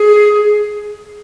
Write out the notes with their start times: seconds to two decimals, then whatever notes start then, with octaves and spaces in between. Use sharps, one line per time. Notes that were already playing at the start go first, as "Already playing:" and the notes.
Already playing: G#4